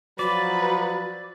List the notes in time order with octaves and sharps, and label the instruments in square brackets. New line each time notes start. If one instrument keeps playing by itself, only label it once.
[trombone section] F3 F#3 [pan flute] F#4 [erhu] B4 [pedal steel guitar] D5